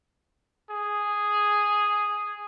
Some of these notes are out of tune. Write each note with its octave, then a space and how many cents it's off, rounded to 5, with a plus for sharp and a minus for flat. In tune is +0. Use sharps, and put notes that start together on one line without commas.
G#4 -5